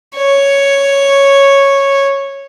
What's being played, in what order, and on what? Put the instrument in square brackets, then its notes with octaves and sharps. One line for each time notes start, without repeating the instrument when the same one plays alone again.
[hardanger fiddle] C#5